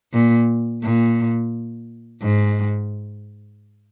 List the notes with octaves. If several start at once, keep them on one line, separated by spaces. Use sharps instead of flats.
A#2
A#2
G#2